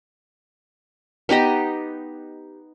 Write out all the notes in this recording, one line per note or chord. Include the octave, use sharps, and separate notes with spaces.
B3 D#4 G4 D#5